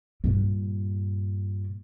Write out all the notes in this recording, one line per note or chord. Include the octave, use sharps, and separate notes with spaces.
G2 A#2